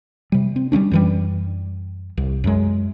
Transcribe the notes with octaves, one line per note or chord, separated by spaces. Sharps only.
C3 G3
C4
G3 A3 C#4 D4
F#2 E3 G3
C2
F#2 G#3